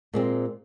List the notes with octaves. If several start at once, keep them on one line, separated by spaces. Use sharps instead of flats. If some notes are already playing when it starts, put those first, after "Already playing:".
A#2 G#3 C4